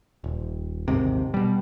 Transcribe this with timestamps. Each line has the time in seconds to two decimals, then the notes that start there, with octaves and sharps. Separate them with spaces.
0.24 D#1
0.88 A1 D#2 G#2 C3
1.34 B2 G3